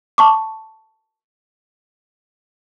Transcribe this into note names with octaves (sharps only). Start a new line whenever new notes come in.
A5 C#6 D6